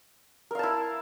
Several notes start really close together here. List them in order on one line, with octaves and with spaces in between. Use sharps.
A#4 F5 A5 E4